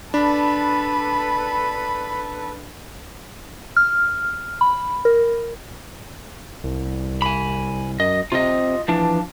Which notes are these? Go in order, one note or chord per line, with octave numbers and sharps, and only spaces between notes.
D4 A4 B4 B5
F6
B5
A#4
C2
G#5 B5
F#2 D#5
C3 F4 D#5
E3 F3 D4